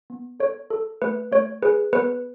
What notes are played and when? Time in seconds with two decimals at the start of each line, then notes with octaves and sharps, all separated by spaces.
0.10 B3
0.40 A4 C#5
0.70 A4
1.02 A3 B4
1.31 A3 C#5
1.62 G#4 B4
1.93 B3 B4